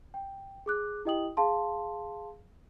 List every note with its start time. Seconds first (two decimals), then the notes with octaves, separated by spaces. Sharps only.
0.14 G5
0.66 G#4 D6 F#6
1.05 E4 G4 D#5 G5 D#6 F#7
1.37 G#4 F5 A5 C6